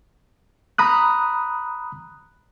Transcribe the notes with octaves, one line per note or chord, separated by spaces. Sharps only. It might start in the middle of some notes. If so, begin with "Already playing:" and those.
A#5 B5 D#6 F#6